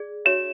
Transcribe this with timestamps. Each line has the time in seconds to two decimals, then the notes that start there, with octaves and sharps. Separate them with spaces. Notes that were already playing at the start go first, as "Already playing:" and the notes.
Already playing: G#4 D5
0.25 D4 F#4 C#5 E5 E7